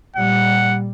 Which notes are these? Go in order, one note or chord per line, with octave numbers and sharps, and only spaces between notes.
A#2 G3 F#5